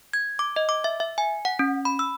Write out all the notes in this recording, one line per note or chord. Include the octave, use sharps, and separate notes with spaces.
G#6
D6
D#5
D6
E5
E5
G#5
F#5
C#4
B5
E6